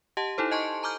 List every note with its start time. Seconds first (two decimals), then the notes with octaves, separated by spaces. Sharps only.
0.17 G4 D#5 F#5 A5
0.38 D#4 E4 A4 C5
0.51 D#5 G#5 A5 C6 C#6
0.83 A5 A#5 D6 F6 G6